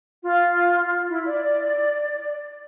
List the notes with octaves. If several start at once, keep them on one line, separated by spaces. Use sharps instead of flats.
F4
E4
D5